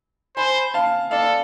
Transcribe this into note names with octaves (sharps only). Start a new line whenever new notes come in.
C5 G#5 B5
F5 A5
A4 D5 F5